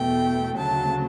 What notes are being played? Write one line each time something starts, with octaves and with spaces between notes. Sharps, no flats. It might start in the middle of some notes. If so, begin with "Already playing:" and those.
Already playing: E2 B2 A3 G5
D2 C#3 F#3 A5